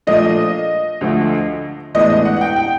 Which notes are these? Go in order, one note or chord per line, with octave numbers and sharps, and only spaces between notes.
A#2 F3 A3 D4 F4 D#5
D2 D3 F3 A3
A2 E3 G#3 B3 D4 D#5
D#5
F#5
F#5
G5
G5